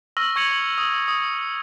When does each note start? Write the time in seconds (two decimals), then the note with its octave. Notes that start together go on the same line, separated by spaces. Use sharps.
0.17 C#6 E6 F6 A#6 F#7 G7
0.36 C#6 G#6 C#7 F7 F#7
0.78 D#6
1.08 D#6